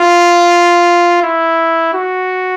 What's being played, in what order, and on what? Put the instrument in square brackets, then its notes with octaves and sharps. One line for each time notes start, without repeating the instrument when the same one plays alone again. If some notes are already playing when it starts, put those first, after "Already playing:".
Already playing: [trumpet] F4
E4
F#4